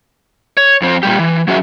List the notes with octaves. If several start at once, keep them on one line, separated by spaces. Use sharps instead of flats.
C#5
F2 C4
A#2 G3 G4
E3
F#3 C#4 F#4 G#4 E5